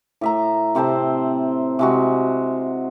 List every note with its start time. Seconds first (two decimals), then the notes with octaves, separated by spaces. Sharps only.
0.21 A2 E5 A#5
0.75 C3 C4 C5 A5
1.79 C3 G#3 F#4